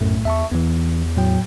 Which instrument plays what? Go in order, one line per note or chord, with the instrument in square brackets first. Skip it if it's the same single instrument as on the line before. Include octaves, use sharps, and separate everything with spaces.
[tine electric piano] B1 A2 A3 [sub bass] F#2
[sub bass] E2 [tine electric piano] E5 A5 C#6
[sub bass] E2 [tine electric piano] E3 B3
[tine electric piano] A2 F#3 G5